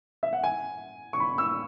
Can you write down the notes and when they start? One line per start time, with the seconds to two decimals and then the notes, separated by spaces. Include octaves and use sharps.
0.23 E5
0.33 F#5
0.43 G#5
1.13 C#6
1.20 B5
1.38 E6